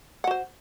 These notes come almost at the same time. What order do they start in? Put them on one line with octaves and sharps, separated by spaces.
F#5 F#4 C5